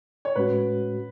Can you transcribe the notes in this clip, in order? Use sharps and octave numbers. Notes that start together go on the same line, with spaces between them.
C#5
A2 G#3 C#4 F#4 B4